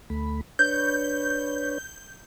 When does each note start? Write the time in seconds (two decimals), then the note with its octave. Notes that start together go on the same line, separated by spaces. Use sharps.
0.10 D2 A3 B5
0.59 D4 B4 C#5 G6